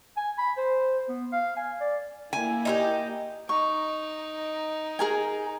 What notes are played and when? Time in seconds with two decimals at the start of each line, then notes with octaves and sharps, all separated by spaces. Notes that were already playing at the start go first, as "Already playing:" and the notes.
0.17 G#5
0.38 B5
0.57 C5
1.09 B3
1.33 F5
1.57 G#5
1.81 D5
2.33 A#3 E4 G#5
2.65 D#4 F4 G4
3.49 D#4 C#6
4.99 G#4 A#4 G#5